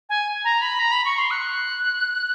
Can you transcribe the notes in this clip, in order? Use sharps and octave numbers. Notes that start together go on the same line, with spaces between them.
G#5
A#5
B5
A#5
B5
C#6
C6
F#6